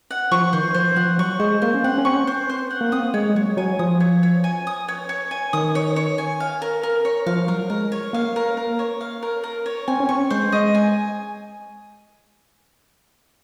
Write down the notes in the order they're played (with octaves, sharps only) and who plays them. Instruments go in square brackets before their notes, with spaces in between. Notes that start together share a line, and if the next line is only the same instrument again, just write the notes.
[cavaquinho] F#5
[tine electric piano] F3 [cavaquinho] C#6
[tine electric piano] D#3 [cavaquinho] C5
[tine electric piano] F3 [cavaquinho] C5
[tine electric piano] F3 [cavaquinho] F#5
[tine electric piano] F#3 [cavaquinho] C#6
[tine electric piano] G#3 [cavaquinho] C5
[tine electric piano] A#3 [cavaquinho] C5
[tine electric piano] C#4
[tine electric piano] C4 [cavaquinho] F#5
[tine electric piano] C#4
[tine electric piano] C4 [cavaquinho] C#6
[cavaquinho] C5
C5
F#5
[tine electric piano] A#3
[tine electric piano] C4 [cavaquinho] D#6
[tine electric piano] G#3 [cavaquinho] C#5
[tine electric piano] G#3
[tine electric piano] F#3 [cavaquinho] C#5
[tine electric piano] F#3 [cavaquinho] G#5
[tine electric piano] F3 [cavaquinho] D#6
[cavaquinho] C#5
C#5
G#5
D#6
C#5
C#5
G#5
[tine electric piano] D#3 [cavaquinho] D#6
[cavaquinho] C#5
C#5
G#5
F5
A#4
A#4
C#5
[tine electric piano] F3 [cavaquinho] F5
[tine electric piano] F#3 [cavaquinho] A#4
[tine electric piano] G#3 [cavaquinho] A#4
[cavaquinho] C#5
[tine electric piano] A#3 [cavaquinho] F5
[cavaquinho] A#4
A#4
C#5
F5
A#4
A#4
C#5
[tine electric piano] C4 [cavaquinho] G#5
[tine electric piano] C#4
[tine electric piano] C4 [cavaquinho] C#6
[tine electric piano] G#3 [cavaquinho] C5
[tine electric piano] G#3 [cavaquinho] D#5
[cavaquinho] G#5